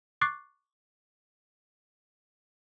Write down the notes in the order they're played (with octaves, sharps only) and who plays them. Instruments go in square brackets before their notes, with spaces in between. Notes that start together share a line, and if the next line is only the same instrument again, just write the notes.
[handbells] C#6 D6 F#6 A6 C7